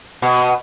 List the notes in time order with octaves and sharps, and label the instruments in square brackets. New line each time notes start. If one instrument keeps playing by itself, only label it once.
[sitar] B2